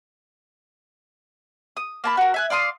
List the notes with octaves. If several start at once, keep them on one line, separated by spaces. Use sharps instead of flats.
D#6
A#3 A5 B5
F#4 A#4
E5 G#5 F#6
D5 F5 C6 D#6